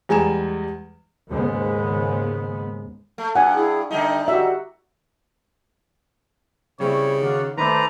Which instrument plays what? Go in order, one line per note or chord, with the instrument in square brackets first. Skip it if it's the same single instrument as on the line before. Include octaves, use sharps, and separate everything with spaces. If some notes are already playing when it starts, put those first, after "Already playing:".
[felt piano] E2 G3 G#3 G#5 A#5 E7
[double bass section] D#2 G#2 C#3 G#3 B3
[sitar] A3
[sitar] G2 [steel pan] F#5 G#5
[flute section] E4 G#4 D#6
[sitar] D3 G3 D#4 [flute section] E5 A5
[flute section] F#4 G4 F#5 [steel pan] E5
[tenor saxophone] C#3 [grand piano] G3 C4 E4 [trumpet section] C#5
[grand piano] D#3 [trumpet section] F4 F#4 D5
[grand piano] D#3 A3 [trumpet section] A4 C5 D5 [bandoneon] B4 A#5